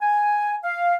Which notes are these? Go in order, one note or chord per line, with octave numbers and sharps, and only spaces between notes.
G#5
F5